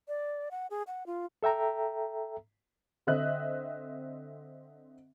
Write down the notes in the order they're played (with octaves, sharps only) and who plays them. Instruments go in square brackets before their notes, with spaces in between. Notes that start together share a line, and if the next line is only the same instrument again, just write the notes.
[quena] D5
F#5
G#4
F#5
F4
[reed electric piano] A4 E5 G5 A#5
[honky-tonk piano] D3 C4 D#5 E5 F#6